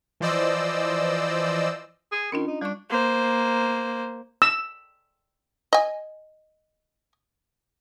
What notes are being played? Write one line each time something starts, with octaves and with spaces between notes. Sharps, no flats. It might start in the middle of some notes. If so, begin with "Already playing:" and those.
E3 F3 C5 D5 D#5 E6
G#4
D#3 C#4 D4 F4
D#4
G3 D4 C#6
A#3 C5
E6
D#5 G#5